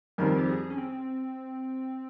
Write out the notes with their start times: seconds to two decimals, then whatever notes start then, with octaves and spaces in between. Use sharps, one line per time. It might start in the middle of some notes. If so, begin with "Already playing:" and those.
0.18 F2 D#3 G3 C4 A#4
0.38 G4
0.48 G#4
0.70 C#4
0.78 C4